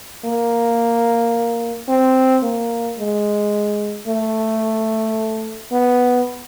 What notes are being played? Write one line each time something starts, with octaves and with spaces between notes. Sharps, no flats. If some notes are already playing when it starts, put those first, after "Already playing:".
A#3
C4
A#3
G#3
A3
B3